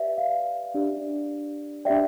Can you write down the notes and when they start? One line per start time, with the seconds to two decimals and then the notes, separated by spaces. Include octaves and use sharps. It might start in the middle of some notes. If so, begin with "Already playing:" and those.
Already playing: G4 B4 D5 E5
0.18 F5
0.75 D4 G4 D5
1.85 D4 G4 B4 D5 E5 G5